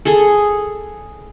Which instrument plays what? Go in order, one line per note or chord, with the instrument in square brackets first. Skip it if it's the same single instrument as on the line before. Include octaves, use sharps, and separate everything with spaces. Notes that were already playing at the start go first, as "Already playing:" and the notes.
[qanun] G#4 A4